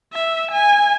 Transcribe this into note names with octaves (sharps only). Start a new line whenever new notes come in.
E5
G#5